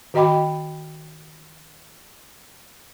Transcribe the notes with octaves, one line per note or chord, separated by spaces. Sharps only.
D#3 F#4 D#5 G5 B5 D6